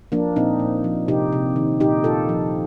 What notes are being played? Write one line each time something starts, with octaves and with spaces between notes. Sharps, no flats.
F3 A#3 D4
A#2 C4 D#4
A#2
F3
C3 D#4 G4
C3
D#3
A#2 D#4 G4
A#2 F4 A4
F3